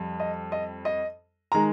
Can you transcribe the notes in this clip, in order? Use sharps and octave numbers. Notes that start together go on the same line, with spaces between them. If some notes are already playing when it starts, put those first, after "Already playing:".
Already playing: F2 G3
D#5
D#5
D#5
D#3 G#3 A#5